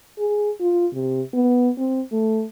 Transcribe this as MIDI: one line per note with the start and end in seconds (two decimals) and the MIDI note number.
0.19 0.51 68
0.61 0.87 65
0.94 1.22 48
1.34 1.70 59
1.78 2.02 60
2.12 2.44 57